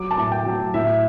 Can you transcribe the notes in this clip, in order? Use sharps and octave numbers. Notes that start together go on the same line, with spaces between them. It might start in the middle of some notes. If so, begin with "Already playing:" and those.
Already playing: F#3 D6
A5
A2
G5
F#3
A2 E5